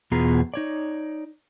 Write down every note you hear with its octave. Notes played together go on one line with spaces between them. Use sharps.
E2 B2 B3 F4 G#4 A#5
D#4 C#5 D5